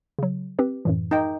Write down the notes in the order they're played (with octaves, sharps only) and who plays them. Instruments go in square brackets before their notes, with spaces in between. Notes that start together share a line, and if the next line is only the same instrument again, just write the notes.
[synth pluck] C#3 F#3
C4 G4 B4
F#2 A2 E3
[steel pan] D#4 G5